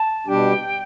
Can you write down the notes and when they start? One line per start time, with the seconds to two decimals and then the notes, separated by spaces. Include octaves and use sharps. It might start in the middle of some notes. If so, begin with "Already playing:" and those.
Already playing: A5
0.27 B2 G3 D4 G4 G5